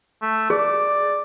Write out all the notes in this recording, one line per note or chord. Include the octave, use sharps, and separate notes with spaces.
A3
G#4 D5